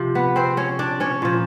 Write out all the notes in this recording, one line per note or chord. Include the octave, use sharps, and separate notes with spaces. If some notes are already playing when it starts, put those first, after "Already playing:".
Already playing: C3 F3
B3 B4
C4 C5
C#4 C#5
D4 D5
C#4 C#5
A#2 F3